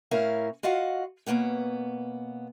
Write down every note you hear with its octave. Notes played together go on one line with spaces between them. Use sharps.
A2 C#4 E4 A#4 F5
F4 F#4 D#5 F5 F#5
B2 G#3 A#3 B3 C#4